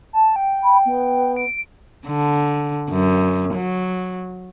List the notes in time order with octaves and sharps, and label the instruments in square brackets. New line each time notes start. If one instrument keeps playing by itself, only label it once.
[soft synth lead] A5
G5
[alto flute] B5
B3
[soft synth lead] D7
[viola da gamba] D3
F#2
F#3